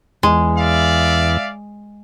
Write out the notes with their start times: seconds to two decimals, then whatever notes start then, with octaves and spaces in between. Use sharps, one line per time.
0.23 E2 G#3
0.58 D5 E5 F5